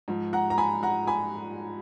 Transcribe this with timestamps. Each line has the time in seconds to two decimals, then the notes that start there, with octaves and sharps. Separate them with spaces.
0.08 G#2 F3
0.33 F#5 A#5
0.50 A#5
0.58 G#5 B5
0.83 F#5 A#5
1.07 G#5 B5